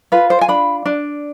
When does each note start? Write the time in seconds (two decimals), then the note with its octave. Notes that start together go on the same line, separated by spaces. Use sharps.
0.12 F4 B4
0.30 C5
0.41 G#5
0.48 D4 B5
0.86 D4